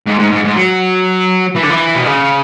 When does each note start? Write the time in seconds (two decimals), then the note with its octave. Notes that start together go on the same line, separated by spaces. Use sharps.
0.06 G#2
0.19 G#2
0.31 G#2
0.44 G#2
0.56 F#3
1.55 E3
1.62 D3
1.70 E3
1.96 B2
2.05 C#3